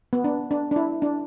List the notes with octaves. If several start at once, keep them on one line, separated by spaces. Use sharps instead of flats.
B3
D4
D4
D4
E4
D4